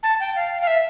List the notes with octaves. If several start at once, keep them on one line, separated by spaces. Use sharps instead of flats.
A5
G5
F5
F5
E5